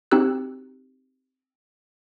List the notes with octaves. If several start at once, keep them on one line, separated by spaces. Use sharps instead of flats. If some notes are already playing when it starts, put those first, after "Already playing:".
C4 D#4 F#4 G4 E6 F#6